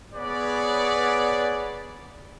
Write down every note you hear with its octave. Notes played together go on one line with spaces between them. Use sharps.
B3 G#4 B4 C#5 D5